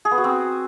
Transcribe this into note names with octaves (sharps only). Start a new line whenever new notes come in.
G#4
B3
F#4
C4